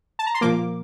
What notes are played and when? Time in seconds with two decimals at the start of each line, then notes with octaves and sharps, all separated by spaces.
0.19 A5
0.26 A#5
0.34 C6
0.41 A#2 F3 A#3 D6